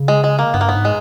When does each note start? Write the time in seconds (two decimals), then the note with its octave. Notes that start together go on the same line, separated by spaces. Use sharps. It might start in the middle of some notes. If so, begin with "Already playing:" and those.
Already playing: C#3
0.08 G#3
0.24 G#3
0.39 A#3
0.54 G2 B3
0.61 A#3
0.69 B3
0.74 G#2
0.85 G#3